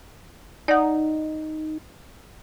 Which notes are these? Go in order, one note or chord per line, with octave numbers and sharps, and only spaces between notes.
D#4 D5 F#5